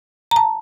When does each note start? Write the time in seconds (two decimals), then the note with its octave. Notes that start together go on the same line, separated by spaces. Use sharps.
0.31 A#5
0.36 A5